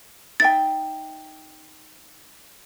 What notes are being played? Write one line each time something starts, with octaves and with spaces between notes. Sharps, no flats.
D#4 E5 G5 A6